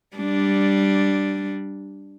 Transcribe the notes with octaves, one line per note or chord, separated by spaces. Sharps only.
G3 D4